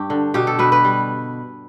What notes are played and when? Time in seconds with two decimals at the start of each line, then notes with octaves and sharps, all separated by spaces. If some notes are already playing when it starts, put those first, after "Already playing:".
Already playing: G2 G4
0.10 D3
0.34 B2 G4
0.47 A4
0.59 B2 B4
0.72 B4
0.84 G3